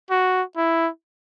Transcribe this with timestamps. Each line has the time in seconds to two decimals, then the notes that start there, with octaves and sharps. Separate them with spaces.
0.10 F#4
0.57 E4